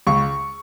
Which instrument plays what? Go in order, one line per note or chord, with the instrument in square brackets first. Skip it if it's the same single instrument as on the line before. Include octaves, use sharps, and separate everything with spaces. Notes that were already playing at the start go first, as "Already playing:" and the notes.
[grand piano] C#2 C#6